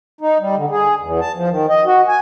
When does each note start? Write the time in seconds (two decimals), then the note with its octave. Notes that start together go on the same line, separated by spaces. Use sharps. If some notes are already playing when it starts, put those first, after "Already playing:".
0.21 D#4
0.40 G3
0.56 D3
0.70 G#4
1.00 E2
1.21 A5
1.35 F3
1.50 D#3
1.69 D#5
1.85 F#4
2.08 G#5